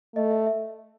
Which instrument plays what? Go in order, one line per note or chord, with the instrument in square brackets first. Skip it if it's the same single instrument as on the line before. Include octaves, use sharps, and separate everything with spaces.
[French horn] A3 [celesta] D#5
[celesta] E5
E5